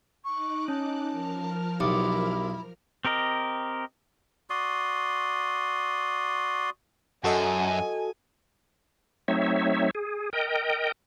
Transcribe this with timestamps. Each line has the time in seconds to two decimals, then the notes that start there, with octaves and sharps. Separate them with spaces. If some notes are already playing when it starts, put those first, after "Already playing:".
0.24 D#4 C#6 D6 F#6
0.68 C#4 A5
1.11 F3 A#4 F6
1.80 B1 E4 G4 D6
3.05 C4 G4 A#4 D#5
4.50 F#4 D5 C6 D#6
7.24 F#2 F#4 A4 D#5 G#5
9.28 F#3 A3 C4 D#4 C#5 E5
9.95 G#4
10.33 A#4 D#5 G5